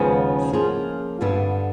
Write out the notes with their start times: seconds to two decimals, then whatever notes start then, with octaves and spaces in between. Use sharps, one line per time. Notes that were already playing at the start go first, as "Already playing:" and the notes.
Already playing: D#2 C#3 F3 G#3 B3
0.53 F3 A#3 C#4 F4 G#4
1.21 G2 D3 G3 B3